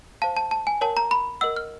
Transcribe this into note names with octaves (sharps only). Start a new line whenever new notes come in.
C5 F5 A5
A5
A5
G#5
A#4 C#5 F#5 A5
A#5
B5
A#4 D#5 F#5 E6
F6